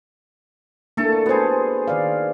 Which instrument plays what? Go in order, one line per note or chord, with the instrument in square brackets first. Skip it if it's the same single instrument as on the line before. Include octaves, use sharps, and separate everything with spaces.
[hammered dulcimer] A3 A4 [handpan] A#3 D4 E4
[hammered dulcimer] B3 G#4 [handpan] F#4 C5
[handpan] D#3 D5 F5